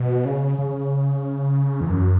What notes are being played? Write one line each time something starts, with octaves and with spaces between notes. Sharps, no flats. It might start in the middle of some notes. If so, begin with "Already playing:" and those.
Already playing: B2
C#3
C#3
E2
F#2